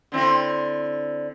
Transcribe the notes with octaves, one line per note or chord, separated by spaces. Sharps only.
D3 C4 E4